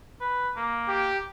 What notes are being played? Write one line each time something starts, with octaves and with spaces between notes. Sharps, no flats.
B4
A#3
G4